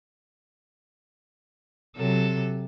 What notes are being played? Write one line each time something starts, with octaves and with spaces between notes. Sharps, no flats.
C3 F#3 A4